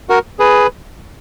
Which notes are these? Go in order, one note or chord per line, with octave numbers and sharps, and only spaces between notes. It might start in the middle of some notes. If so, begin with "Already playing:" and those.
F#4 A#4
G#4 B4